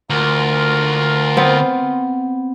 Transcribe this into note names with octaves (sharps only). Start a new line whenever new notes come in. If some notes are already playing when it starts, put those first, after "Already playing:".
D2 F4 A#4
B3 C4